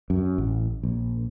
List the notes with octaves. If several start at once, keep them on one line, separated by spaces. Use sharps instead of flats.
F#2
A1
A#1